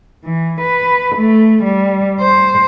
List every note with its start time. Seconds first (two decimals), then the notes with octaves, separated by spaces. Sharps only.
0.25 E3
0.61 B4
1.16 A3
1.64 G3
2.20 C5